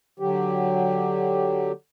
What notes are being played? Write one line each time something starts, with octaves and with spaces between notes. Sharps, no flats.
D3 F#3 G4